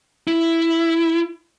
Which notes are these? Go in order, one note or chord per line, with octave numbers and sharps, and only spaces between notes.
E4